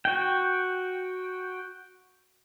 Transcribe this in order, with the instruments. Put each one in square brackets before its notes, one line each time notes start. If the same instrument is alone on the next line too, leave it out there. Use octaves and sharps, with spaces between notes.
[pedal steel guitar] F#4 G5